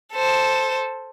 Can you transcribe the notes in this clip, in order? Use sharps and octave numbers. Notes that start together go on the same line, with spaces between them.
A4 C5